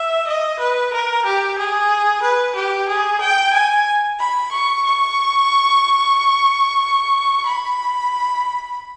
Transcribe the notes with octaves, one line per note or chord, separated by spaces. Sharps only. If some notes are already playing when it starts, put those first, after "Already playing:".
Already playing: E5
D#5
B4
A#4
G4
G#4
B4
G4
G#4
G5
G#5
B5
C#6
C#6
B5